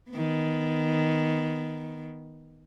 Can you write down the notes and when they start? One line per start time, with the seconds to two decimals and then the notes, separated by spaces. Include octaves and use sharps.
0.11 D#3 B3